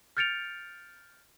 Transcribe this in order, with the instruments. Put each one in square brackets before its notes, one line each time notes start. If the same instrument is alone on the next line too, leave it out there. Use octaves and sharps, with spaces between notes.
[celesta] F6 G6 A6 C#7 D7 F7